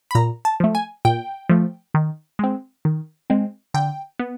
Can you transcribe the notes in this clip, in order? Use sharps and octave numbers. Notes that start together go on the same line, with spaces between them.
B5
A#2 A#5
A5
F3 A3
G#5
A#2 G5
F3 A3
D#3
G#3 C4
D#3
G#3 C4
D3 G5
B3